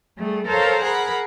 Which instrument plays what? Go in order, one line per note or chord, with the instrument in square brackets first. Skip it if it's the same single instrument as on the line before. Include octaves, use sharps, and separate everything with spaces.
[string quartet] G3 A3 G#4
A4 A#4 C5 C#5 F5
G#4 A#4 F#5 B5